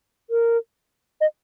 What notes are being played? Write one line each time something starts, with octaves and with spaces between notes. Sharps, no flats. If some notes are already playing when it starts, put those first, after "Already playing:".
A#4
D#5